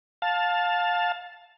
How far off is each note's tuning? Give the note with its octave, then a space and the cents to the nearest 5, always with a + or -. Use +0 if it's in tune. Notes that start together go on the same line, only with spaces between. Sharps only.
F5 +20 A5 +0